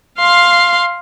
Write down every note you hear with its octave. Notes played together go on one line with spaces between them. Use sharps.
F5 C6